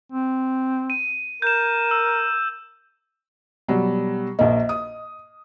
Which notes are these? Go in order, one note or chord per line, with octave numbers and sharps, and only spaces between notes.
C4
D#7
A#4 G6 E7
E6
B2 F#3 G3
A#1 A#3 D#5
D#6